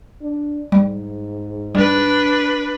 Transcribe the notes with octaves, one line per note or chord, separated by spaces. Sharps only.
D4
G#2 G3
G3 D4 B4